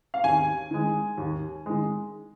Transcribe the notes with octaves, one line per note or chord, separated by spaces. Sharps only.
F5
D#2 G#5
D#3 G#3
D#2
D#3 G#3